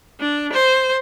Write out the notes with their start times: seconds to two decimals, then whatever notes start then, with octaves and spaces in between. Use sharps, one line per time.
0.20 D4
0.53 C5